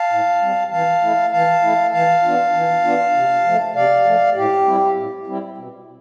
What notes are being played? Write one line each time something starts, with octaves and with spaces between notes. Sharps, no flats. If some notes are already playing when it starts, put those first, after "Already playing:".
Already playing: F5 A5
A2
G3 C4
E3 F5 A5
A3 E4
E3 F5 A5
A3 E4
E3 F5 A5
B3 D4 F4
E3
B3 D4 F4
C3
F3 A3
C3 D5 F5
F3 A3
A2 G4
G3 C4 E4
A2
G3 C4 E4
B2